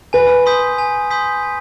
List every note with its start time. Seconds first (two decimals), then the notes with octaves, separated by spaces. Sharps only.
0.13 B4 G#5
0.46 C6 D#6 G6 B6
0.78 G#5
1.11 C6 D#6 G6 B6
1.43 G#5